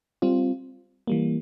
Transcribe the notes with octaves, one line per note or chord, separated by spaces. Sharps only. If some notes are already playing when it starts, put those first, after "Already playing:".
G3 C4 F4
E3 G3 A#3